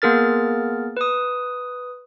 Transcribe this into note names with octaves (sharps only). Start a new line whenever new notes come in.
A#3 B3 G#4 A#4 F6 A6
B4 D#6